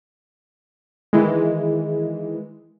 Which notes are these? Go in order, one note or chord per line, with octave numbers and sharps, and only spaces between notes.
D#3 E3 G#3